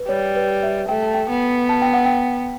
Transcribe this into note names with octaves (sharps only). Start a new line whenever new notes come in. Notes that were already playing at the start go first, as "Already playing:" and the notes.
Already playing: B4
G3 C#5
B4
E5
A3 G5
A5
G5
B3
A5
G5
F#5
G5